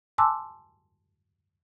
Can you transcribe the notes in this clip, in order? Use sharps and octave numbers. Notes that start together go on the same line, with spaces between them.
G#5 A5 C6 D6 E6 F#6